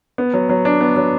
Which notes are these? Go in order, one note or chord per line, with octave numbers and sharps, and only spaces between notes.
B3
F#3
F#3
D4
B3
F#3